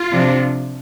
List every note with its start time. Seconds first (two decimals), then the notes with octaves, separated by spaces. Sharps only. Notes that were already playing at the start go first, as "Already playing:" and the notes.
Already playing: F4
0.12 C3 F3 D4